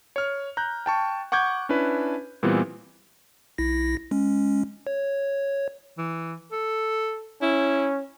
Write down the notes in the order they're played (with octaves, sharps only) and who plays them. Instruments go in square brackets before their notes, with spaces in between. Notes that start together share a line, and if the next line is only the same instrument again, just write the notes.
[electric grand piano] C#5 F6
A#5 F#6 G6
G5 A5 C#6
F#5 C#6 D6 G6 G#6
C#4 D4 E4 B4
A#2 E3 G3 B3 C4
[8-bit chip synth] B1 E4 A#6
G#3 C#4
C#5
[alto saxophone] E3
A4
[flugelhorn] C#4 [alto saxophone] E4